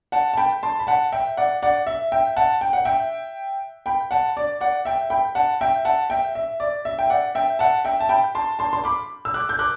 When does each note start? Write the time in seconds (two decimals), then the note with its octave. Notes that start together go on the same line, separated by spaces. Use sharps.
0.12 F#5 A5
0.33 A5
0.37 G5 B5
0.63 A5 C6
0.80 B5
0.87 F#5 A5
1.12 E5 G5
1.37 D5 F#5
1.63 D5 F#5
1.87 E5
2.12 E5 G5
2.36 F#5 A5
2.61 G5
2.73 F#5
2.85 E5 G5
3.86 G5 B5
4.11 F#5 A5
4.37 D5
4.61 D5 F#5
4.85 E5 G5
5.10 G5 B5
5.35 F#5 A5
5.61 E5 G5
5.85 F#5 A5
6.10 E5 G5
6.35 E5
6.60 D5
6.85 E5
6.99 G5
7.10 D5 F#5
7.35 E5 G5
7.59 F#5 A5
7.85 E5 G5
8.00 A5
8.09 G5 B5
8.35 A5 C6
8.59 A5 C6
8.73 C6
8.84 B5 D6
9.25 E6
9.34 D6 F#6
9.49 G6
9.59 D6 F#6